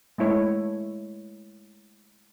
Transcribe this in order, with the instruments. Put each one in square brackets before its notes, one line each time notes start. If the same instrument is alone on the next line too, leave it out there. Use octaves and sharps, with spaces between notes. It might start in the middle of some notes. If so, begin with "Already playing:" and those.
[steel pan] G#3 A3 E4 C#5